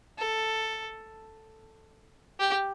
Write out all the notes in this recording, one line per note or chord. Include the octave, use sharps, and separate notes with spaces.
A4
G4